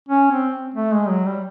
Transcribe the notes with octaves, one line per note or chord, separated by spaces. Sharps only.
C#4
C4
A3
G#3
F#3
G3